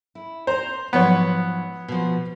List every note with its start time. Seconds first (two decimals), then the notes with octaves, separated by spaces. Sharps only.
0.15 E4
0.47 C5 A#5
0.93 G#2 F3 F#3 B3 C#5
1.88 B2 F3